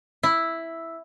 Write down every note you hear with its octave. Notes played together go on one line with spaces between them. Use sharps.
E4